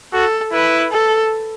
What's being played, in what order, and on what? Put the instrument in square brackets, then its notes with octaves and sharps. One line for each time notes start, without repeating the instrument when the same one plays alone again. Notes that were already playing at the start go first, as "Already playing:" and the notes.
[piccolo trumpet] F#4 [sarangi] A4
[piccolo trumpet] E4 [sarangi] B4
[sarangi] A4